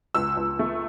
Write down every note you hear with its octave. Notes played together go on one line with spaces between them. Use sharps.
C#2 E6
C#2
A3